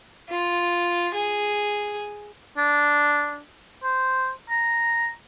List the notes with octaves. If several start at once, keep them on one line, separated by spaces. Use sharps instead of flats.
F4
G#4
D4
C5
A#5